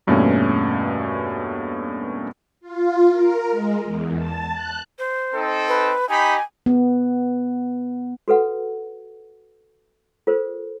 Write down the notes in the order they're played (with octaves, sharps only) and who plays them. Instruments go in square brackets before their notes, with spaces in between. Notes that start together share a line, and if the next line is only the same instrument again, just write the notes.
[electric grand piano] E2 G2 B2 A3 A#3 C#4
[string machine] F4
A#4
G#3
E2
A5
F#6
[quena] C5
[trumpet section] C4 D#4 A4
[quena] B4
[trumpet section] D#4 G4 B5 [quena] G#5
[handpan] B3
[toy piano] F#4 A4 B4 F#5
F4 A4 A#4 C5